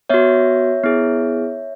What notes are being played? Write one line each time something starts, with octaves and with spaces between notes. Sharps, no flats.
B3 F#4 C#5 E5
B3 E4 G#4